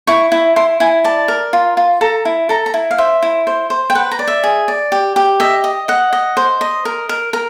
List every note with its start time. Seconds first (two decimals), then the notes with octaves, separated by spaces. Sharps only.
0.07 E4 C#6
0.32 E4
0.56 E4 C6
0.80 E4 G#5
1.04 D5 A5
1.28 A#4
1.53 F4
1.77 F4
2.01 A4 A#5
2.25 E4
2.49 A4 A#5
2.66 A#5
2.74 E4
2.91 F5
2.98 C5 E5
3.22 E4
3.47 C5
3.70 C5
3.90 G5
3.95 B4 F#5
4.11 A#5
4.19 D5
4.28 E5
4.44 G#4
4.68 D5
4.92 G4
5.16 G4
5.40 D#5 E5
5.64 D#5
5.88 D#5 F#5
6.13 D#5
6.37 C5
6.61 D#5
6.85 A#4
7.09 A#4
7.33 A#4